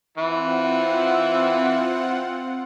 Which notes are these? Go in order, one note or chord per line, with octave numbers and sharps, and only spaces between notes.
E3 C4 E4 F4 F#5